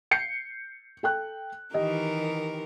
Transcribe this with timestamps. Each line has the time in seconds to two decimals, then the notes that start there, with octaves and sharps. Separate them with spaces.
0.11 G6 C7 C#7
1.03 A4 G5 F#6
1.74 D#3 E3 G4 A#4 D#5